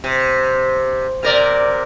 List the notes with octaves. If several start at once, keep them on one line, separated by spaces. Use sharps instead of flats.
C3
C3 A#4 D5